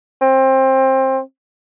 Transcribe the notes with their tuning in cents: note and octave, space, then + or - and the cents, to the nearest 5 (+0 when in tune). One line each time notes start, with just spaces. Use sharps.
C4 +20